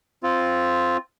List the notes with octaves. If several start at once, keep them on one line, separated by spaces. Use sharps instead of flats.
C4 F4